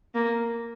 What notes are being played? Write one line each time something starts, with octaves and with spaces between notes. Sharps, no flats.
A#3